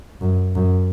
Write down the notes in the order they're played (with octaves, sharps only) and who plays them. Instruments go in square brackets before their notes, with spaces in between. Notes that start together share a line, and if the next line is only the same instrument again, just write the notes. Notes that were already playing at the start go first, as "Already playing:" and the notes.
[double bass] F#2
F#2